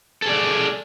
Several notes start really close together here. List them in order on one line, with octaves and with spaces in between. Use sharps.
A4 G#4 D5